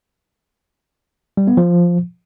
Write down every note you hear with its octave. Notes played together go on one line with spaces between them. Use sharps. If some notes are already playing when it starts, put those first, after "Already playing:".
G3
B3
F3